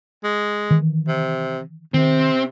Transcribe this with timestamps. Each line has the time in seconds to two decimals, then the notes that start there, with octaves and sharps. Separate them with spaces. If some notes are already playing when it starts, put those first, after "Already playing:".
0.24 G#3
0.71 D#3 E3
1.08 C3
1.94 C3 D#3 C4